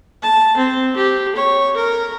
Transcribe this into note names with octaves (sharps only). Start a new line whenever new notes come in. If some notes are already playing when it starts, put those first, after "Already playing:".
A5
C4
G4
C#5
A#4